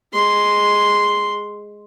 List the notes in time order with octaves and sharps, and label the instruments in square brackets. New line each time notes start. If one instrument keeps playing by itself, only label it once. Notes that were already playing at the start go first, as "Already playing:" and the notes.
[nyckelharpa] G#3 C6